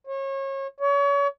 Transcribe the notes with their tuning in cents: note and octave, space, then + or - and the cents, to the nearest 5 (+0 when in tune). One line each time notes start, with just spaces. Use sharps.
C#5 -30
C#5 +35